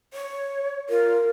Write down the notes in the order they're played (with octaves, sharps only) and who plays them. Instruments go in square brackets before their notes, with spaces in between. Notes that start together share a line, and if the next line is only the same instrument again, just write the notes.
[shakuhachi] C#5
[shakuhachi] F4 [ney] A#4